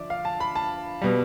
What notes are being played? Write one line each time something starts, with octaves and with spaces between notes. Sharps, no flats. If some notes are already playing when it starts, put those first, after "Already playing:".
Already playing: D3 F3 D5 E5
F5
A5
B5
A5
B2 G3